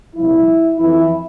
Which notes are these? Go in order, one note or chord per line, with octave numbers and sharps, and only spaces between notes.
C2 A#2 F3 E4
F2 E3 E4